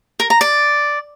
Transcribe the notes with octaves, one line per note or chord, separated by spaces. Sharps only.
A#4
A#5
D5